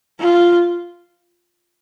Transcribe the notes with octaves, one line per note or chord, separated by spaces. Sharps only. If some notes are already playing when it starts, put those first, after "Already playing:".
F4